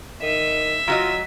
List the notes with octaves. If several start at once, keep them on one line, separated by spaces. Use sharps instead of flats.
D#3 E5
F#3 F4 F#4 D#5